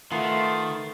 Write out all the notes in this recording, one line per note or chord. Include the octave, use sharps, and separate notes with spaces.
D#3 A3 F4 B4 F#5 C6